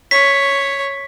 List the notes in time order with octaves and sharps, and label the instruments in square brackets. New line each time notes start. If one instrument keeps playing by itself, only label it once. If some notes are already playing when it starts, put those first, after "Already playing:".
[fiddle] C#5 [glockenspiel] B6